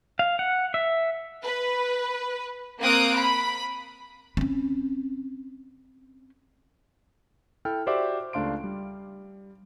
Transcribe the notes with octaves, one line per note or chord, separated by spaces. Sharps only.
F5
F#5
E5
B4
A#3 C4 F5 D#6 F#6 D7
B5
C4 C#4
E4 A4 G5 F6
F#4 G4 C5 D5 E5 D6
C#2 A3 D4 F5 C6 D7
G3